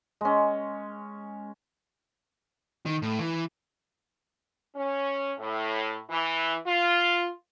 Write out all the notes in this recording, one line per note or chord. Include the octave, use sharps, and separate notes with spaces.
G#3 C#4
D#3
A2
E3
C#4
A2
E3
F4